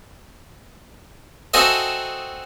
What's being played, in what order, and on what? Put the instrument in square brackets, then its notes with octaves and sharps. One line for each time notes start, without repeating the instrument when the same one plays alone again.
[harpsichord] C4 F#4 G#4 A4 D#5 E5